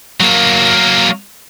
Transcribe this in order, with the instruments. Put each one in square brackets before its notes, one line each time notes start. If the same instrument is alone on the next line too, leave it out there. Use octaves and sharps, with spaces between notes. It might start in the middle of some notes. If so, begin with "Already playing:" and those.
[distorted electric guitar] F#3 A#3